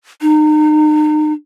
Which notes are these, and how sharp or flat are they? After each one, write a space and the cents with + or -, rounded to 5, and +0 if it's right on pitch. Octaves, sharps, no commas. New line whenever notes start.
D#4 -35